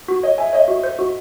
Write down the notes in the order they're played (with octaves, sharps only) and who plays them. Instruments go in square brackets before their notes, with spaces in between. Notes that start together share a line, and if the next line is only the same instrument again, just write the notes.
[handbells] F#4
[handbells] C#5 [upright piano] D#5
[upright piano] E5 [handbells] G#5
[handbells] C#5 [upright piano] D#5
[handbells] F#4
C5
F#4